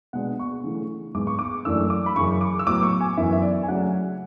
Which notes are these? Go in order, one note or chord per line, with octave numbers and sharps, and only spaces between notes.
B2 G#3 B3 D4 F#5
C#6
C#3 E3 A3
G#2 G#3 B3 D6
C#6
D6
F#2 E3 A3 D4 E6
D6
B5
F#2 C#3 E3 C#6
D6
E6
A2 F#3 B3 D6
C#6
G#5
F#2 E3 B3 E5
E5
D5
G#5
C#3 F#3 A3 C#4 F#5